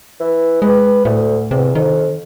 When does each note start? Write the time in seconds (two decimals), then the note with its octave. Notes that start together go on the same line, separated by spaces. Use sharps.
0.20 E3
0.62 G#3 B4
1.05 D2 A2
1.51 E2 C3
1.75 F2 D#3